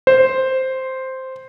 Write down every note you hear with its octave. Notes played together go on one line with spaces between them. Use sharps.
C5